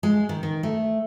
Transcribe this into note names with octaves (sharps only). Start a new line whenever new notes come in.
G#3
D#3
D#3
A3